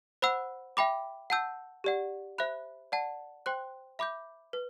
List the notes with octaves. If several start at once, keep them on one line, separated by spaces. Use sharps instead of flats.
C5 F#5 B5 E6
E5 G5 B5 D6
F#5 A5 E6 G6
G4 D5 F#5
C5 E5 B5 F#6
D5 F#5 A5
C5 G5 C6 F#6
E5 B5 D6 G6
B4